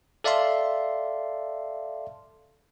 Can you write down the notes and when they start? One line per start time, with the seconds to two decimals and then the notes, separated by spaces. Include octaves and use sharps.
0.24 A4 D5 E5 F5 A5 C6